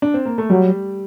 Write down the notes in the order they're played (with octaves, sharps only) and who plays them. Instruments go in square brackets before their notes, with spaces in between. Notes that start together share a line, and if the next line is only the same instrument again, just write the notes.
[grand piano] D4
C4
A#3
A3
[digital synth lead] F#3 [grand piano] G3